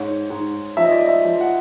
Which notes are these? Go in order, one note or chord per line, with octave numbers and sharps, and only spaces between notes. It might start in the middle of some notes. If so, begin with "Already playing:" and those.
Already playing: G#2 C#5
G#2
F3 E5
D#5
D5
D#5
E5
F3
F#5